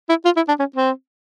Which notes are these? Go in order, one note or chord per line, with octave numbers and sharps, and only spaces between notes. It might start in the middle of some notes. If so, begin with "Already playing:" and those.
E4
F4
E4
D4
C#4
C4